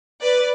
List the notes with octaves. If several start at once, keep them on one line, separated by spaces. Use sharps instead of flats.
B4 D5